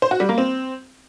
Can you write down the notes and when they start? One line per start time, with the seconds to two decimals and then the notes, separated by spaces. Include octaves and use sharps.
0.02 C5
0.11 F#4
0.20 G3
0.29 A#3
0.38 C4